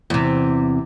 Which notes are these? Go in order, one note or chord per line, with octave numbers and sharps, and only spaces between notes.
E2 C3